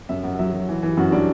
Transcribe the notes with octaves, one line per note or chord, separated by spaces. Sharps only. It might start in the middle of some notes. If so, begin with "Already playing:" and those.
F#2 E5
F#2 F#5
F#3 E5
F#3
E3
E3
F#2 F#4
G3 D4